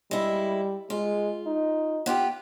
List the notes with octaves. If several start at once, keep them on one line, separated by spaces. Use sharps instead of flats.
G3 G#3 E4
G#3 F4
D#4
B3 F4 G4